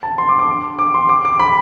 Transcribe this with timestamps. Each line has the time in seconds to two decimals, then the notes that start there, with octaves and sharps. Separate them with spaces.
0.03 A5
0.18 C6
0.29 D6
0.39 D6
0.79 D6
0.94 C6
1.09 D6
1.25 D6
1.39 B5